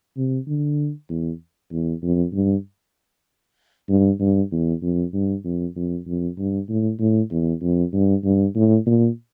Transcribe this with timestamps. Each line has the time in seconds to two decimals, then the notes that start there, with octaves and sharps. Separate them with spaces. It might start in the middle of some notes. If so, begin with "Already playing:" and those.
0.17 C3
0.47 D3
1.09 E2
1.72 E2
2.03 F2
2.33 G2
3.89 G2
4.20 G2
4.52 E2
4.82 F2
5.14 G2
5.45 F2
5.76 F2
6.07 F2
6.38 G2
6.69 A2
6.99 A2
7.31 E2
7.62 F2
7.93 G2
8.24 G2
8.55 A2
8.86 A#2